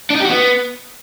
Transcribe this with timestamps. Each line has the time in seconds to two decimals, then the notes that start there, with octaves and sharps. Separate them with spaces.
0.10 D4
0.15 D#4
0.20 G4
0.25 F#4
0.30 B3